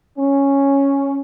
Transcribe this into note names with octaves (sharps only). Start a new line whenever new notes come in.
C#4